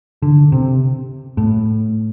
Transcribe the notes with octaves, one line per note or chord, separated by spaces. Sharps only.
D3
C3
A2